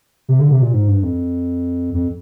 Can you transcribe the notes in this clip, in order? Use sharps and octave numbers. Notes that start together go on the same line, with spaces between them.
C3
D3
C3
A#2
G#2
G2
F2
F2